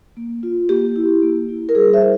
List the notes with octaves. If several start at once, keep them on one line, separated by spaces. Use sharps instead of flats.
A#3
F4
A#3 G4
E4
A#3
E4
A#4
G3 G#4
C5 E5
E4